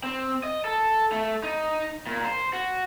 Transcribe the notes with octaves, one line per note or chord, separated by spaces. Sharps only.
C4
D#5
A4
A3
D#4
A#2
C5
F#4